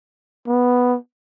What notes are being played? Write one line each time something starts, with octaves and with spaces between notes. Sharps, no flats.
B3